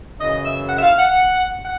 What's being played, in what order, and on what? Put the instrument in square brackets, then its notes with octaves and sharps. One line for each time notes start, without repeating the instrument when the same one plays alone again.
[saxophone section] F#2 C#3 E3 D#5
E5
F#5
E5
F5
F#5
F#5